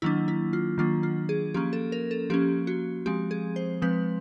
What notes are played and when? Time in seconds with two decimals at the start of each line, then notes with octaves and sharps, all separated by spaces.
0.02 D#3 F#3 A#3 D4 E4
0.28 E4
0.53 F4
0.78 D#3 F#3 A#3 D4 F4
1.03 F4
1.29 G#4
1.54 F3 A#3 C#4 G4
1.73 A4
1.92 A#4
2.11 A4
2.30 F3 A#3 C#4 G4
2.67 F#4
3.06 F3 G#3 C4 G4
3.31 G#4
3.56 C5
3.82 F3 G#3 C4 B4